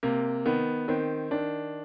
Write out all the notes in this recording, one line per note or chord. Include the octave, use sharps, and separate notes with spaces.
C3 A#3
D#3 B3
D#3 C4
D#3 D4